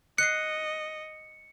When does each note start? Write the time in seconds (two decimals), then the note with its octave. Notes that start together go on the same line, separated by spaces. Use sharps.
0.18 D#5 F#6 C7 C#7